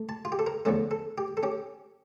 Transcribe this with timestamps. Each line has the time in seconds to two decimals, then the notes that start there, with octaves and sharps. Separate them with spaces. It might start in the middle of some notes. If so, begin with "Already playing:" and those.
Already playing: A3
0.09 A5
0.25 F4
0.32 G4
0.39 A4
0.46 A#4
0.65 E2 D3 F3 A3 C#4 A4
0.91 A4
1.18 G4
1.37 A4
1.43 C#4 G4